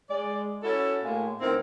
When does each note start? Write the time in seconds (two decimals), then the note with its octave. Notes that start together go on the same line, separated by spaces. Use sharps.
0.09 G#3 D5
0.63 C#4 E4 F#4 A4
1.03 A2 G#3 A#3
1.41 D2 D#3 B3 C4 E4 A#4